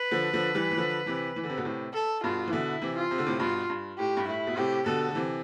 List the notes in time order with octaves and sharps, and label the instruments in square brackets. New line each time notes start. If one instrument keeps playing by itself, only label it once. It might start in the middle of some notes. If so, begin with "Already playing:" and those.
Already playing: [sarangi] B4
[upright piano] D3 F3
D3 F3
E3 G3
E3
D3 F3
C3 E3
E3
D3
C3
B2 D3
A2 C3
[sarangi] A4
[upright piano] G2 B2 [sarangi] F4
[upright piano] E3
[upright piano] B2 D3 [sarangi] E4
[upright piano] C3 E3
[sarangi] F4
[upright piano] C3
D3
A2 C3
[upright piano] G2 B2 [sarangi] F4
[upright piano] G2
[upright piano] A2 [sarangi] G4
[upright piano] G2
[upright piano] A2 [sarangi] E4
[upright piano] B2
[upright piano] A2 C3 [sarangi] G4
[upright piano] B2 D3 [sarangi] A4
[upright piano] D3
C3 E3